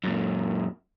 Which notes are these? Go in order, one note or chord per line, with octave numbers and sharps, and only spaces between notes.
F#2 A#2